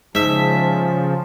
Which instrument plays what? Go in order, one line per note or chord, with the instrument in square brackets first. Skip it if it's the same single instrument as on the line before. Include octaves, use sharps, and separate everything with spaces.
[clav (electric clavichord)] G#2 [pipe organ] C#3 F3 [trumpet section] C#4 A5 [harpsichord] E5